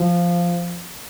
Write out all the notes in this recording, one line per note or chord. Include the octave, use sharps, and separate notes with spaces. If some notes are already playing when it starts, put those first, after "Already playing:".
Already playing: F3